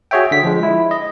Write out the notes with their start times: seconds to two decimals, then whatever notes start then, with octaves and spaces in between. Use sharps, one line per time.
0.11 F#4 G#4 C#5 E5 G5
0.31 D3 B6
0.43 F3 G#3
0.63 E4
0.91 D#5